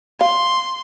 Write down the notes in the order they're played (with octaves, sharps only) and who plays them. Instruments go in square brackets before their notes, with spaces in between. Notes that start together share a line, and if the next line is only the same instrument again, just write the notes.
[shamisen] F5 [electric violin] C6